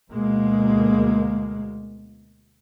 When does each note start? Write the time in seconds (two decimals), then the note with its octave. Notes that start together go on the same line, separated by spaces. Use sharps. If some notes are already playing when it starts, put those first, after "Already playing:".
0.11 D2 B2 G#3 A#3